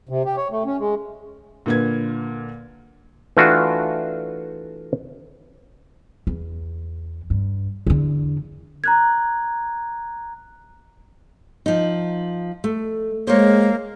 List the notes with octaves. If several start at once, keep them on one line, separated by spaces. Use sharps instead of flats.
C3
G4
C#5
A3
C#4
G#3
A#2 D3 A#3 B4 G#6
E3 A3 D4 F4 F#4
E2
G2
E2 D3
A#5 F#6 G#6
F3 D#4
A3
G#3 A#3 C5 C#5